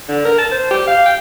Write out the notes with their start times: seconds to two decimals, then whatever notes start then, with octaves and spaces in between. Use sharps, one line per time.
0.09 D3
0.25 A#4
0.38 A5
0.51 C5
0.71 G4
0.87 F5
1.06 G5